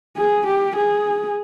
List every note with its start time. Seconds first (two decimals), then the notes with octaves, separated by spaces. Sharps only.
0.17 G#4
0.46 G4
0.76 G#4